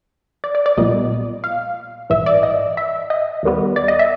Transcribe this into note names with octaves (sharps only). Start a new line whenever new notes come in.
D5
D5
D5
B1 A#2 G3 B3 D#5
F5
A#1 G#2 E3 E5
D5
D#5
E5
D#5
D#2 D#3 G3 B3
D5
D#5
E5